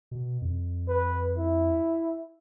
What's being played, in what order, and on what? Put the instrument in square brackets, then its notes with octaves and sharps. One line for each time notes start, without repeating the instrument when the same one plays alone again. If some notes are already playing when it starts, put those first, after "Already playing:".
[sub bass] B2
F2
[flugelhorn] B4
E4